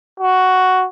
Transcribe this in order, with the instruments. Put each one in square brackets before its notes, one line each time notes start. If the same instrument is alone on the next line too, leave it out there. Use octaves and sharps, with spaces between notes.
[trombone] F#4